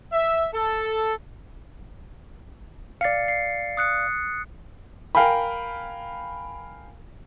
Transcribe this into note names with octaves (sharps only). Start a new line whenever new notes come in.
E5
A4
D5 F5 A6 C7 C#7
C7
D#6 F#6 C#7
A#4 F5 G5 G#5 B5